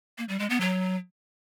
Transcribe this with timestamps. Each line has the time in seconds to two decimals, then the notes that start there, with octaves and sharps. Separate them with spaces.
0.18 A#3
0.29 G3
0.39 G#3
0.50 B3
0.61 F#3